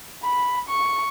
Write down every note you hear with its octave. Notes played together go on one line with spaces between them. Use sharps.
B5
C#6